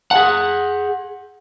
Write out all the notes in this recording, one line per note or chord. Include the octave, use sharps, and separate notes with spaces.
G#4 F#5